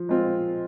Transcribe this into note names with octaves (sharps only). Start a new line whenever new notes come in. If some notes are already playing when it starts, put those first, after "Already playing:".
Already playing: F3
G#3 C4 F4